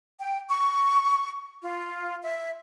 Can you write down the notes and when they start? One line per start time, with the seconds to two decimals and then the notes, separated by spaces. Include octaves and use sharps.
0.20 G5
0.49 C#6
1.63 F4
2.23 E5